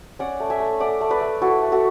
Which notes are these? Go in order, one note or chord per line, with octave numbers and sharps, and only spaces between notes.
C#4 D5 F#5
A3
E5 G#5
A3
A3 D5 F#5
A3
B4 D5
A3
E4 F#4 A4
A3
F#4 A4